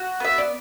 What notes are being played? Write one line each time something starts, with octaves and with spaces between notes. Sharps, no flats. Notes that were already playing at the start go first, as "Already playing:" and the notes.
Already playing: F#4
B3 E5
D5